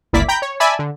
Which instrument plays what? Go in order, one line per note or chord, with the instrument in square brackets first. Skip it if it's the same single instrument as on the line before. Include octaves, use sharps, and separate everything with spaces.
[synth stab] G1 C#2 A#3 E4 D5 B6
G5 A#5 B5 G6
C#5
D5 E5 G#5 A5 B5 E6
D3